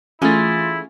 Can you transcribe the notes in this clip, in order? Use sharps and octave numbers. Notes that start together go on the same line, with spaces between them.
E3 A3 C#4 E4 F4 G#4 F5 A6